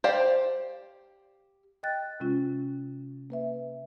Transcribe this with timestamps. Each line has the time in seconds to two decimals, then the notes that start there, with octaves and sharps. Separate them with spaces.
0.04 G4 C5 D5 F5
1.83 D#5 G5 F#6 A6
2.20 C3 G#3 C#4 F4
3.30 A#3 B4 E5